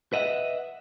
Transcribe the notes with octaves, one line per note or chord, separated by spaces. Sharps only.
B4 D#5 E5 F#5